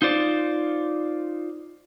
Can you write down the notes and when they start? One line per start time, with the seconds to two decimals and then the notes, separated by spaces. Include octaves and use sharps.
0.02 D#4 F4 C5 D5